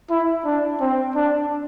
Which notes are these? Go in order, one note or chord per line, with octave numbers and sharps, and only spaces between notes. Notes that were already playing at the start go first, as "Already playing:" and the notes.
E4
D4
C4
D4